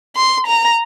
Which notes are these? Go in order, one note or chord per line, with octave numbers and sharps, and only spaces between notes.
C6
A#5